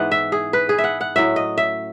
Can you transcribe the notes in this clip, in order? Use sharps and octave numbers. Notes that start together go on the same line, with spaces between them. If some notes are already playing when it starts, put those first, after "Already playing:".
Already playing: G#2 E3 B3 F#5
E5
G#4
B4
G#4
E5
F#5
F#5
A2 F#3 C#4 E5
D#5
E5